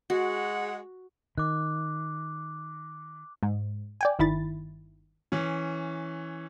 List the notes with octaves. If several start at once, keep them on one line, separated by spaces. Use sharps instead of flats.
G#3 F#4 F#5
D#3 D6 F#6
G#2
D5 G5 G#5
G1 D#3 E4 B5 A6
E3 C#4